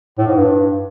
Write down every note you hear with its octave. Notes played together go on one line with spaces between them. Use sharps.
A2
G#2
G2